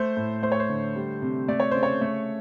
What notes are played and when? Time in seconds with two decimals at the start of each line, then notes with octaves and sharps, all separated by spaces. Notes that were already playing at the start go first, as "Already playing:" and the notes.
Already playing: A3 C5
0.17 A2
0.43 A3 C5
0.52 C#5
0.60 C5
0.69 D3
0.96 G3
1.22 C3
1.48 A3 D5
1.60 C#5
1.71 C#3 C5
1.83 C#5
2.01 A3